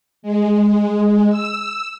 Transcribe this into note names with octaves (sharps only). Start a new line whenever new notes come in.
G#3
E6